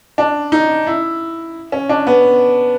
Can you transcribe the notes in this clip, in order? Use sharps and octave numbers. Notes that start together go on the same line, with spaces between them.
D4
D#4
E4
C#4
D4
B3